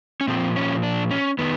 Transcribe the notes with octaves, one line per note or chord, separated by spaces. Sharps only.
C#4
A#2 F3 C4
C#4
D4
C#4
D#3 B3